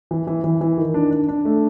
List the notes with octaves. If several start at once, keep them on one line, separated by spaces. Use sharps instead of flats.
E3
E3
E3
E3
D#3
D4
D4
D4
A3